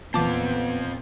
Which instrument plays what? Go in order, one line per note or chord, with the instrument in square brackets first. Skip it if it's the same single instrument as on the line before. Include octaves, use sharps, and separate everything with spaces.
[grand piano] E2 A#2 [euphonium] B3 [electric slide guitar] C4 F4 [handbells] A5 D6